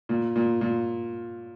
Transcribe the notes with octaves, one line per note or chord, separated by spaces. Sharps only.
A#2
A#2
A#2